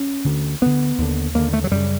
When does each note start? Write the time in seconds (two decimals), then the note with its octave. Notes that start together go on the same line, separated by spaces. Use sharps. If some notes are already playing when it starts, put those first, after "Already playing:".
Already playing: C#4
0.25 D2 D3
0.62 D2 D3 B3
0.98 D#2 D3
1.34 D#2 D3 A#3
1.53 A3
1.64 F#3
1.71 F#2 C#3 G3